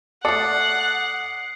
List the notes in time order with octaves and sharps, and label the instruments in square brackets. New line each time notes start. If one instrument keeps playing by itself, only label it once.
[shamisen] A3 A4 [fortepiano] D5 [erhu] F#5 [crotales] D#6 C7 C#7